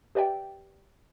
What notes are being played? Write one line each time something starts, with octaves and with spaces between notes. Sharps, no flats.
G4 B4 D5 E5 G5